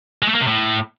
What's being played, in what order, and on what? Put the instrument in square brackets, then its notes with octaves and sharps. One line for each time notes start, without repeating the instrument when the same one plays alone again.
[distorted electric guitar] G#3
A3
A#3
C3
A2